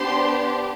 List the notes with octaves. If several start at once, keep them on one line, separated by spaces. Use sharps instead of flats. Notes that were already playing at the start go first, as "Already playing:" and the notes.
Already playing: B3 D4 G4 C5 C6